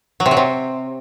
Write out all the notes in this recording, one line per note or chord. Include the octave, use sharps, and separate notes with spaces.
F#3
C3
F#3
C3